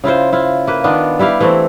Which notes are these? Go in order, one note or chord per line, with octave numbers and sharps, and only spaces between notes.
C#3 E4 F4 C5
E4 F4
A#3 B4
D#3 B3 D4 F4
G3 E4 G4 F5
E3 A3 C4